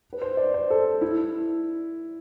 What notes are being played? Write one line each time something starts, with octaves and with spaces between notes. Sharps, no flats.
B4
C5
D5
C5
A4
E4